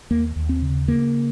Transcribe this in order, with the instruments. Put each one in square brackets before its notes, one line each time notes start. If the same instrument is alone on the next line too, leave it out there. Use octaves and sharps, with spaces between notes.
[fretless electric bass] D#2 A#3
D#2
C4
C#3
C#3 A#3